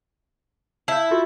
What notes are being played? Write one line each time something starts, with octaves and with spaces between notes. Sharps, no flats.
E4 A5 G6
F4 F#4 A4